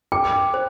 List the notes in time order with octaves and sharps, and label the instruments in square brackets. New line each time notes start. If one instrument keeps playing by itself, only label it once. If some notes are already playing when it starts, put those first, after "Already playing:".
[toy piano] G5 [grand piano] D6
[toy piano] C5